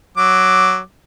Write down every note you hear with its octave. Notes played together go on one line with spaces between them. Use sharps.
F#3 D6